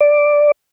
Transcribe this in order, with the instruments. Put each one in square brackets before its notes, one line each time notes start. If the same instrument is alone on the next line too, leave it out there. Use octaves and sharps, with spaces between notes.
[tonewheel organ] D5